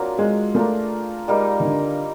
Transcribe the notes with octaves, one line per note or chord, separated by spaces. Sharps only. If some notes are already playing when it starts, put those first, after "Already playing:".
Already playing: F#3 A#3 C4 D4 F4 G#4
G#3
A3 A#3 D4 F4 G#4
G3 G#3 A#3 D#4
D#3
D3